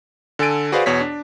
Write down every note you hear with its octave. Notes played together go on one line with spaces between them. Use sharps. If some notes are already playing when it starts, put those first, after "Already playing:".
D3 A4 G#5 A6 D7 D#7
F#4 G#4 B4 C5 D5 F5
E2 B2 C#5 B6
D4